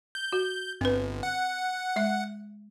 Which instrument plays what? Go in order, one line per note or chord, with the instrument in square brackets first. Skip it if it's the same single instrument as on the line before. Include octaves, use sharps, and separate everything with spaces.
[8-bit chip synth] G6
[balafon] F#4
[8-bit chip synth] G1 [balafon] C4 B4
[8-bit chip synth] F#5
[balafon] G#3 E5